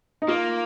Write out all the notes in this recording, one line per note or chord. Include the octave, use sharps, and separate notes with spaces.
D#4
A#3 F4